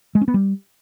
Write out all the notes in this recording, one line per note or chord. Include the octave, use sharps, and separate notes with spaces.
G#3
C#4
B3
G3